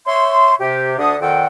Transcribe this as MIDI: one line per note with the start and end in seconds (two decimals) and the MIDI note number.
0.07 0.54 73
0.07 0.54 76
0.07 0.54 84
0.61 0.98 48
0.61 0.98 67
0.99 1.16 38
0.99 1.16 50
0.99 1.16 62
0.99 1.16 78
0.99 1.16 87
1.21 1.46 41
1.21 1.46 46
1.21 1.46 51
1.21 1.46 69
1.21 1.46 78
1.21 1.46 79